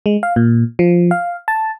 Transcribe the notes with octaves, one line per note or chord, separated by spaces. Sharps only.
G#3
F5
A#2
F3
F5
A5